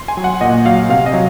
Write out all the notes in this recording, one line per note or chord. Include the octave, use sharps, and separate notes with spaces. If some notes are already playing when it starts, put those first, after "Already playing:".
Already playing: C6
G#5
F#3
F#5
A#2 D#5
F#3 F5
C3 F5
D#5
F#3